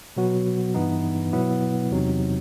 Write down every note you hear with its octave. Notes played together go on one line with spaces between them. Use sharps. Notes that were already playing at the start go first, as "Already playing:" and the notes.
B2 F#3 B3 F#4
G2 E3 B3 D#4
B2 F#3 B3 E4
E2 C3 F#3 C4 D#4